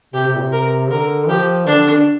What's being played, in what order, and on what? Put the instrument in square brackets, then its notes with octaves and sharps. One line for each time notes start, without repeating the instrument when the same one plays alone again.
[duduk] C3 [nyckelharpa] G4
[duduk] C3
A#2
C3
[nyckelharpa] A#4
[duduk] D3 [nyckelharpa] A#4
[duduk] F3 [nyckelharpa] G4
[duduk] D3 [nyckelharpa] D4
[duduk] D4